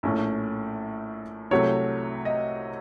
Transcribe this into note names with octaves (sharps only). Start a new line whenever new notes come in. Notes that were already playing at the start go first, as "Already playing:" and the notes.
A#1 A2 A3 C#4
C2 C3 F#3 A3 C#5
D#5